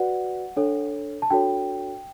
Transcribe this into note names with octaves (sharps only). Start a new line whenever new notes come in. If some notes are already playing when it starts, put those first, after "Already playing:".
Already playing: F#4 B4 D5 F#5
D4 A4 C#5
A5
D4 F#4 A4 C#5 G5